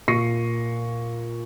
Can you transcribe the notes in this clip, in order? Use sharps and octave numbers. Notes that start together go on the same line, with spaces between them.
A#2 C#6 A#6 C7 C#7 D#7